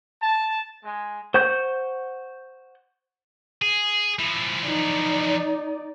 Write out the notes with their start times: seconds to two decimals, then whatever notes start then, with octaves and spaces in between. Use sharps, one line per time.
0.22 A5
0.84 G#3
1.34 C5 F#5 C#6 G6
3.62 G#4
4.19 E3 F3
4.65 D#4 D5